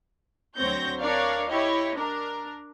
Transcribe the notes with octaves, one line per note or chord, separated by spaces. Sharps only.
D2 F#3 C4 C#5 G6 A#6
D4 A#4 C#5 D5 F5
E4 G4 C#5 D#5
D4 A#4